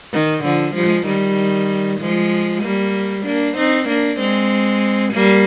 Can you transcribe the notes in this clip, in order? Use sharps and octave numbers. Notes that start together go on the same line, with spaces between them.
D#3
D3 F3
F3 G#3
D#3 G3
F3 G#3
G3 A#3
A#3 D4
C4 D#4
A#3 D4
G#3 C4
G3 A#3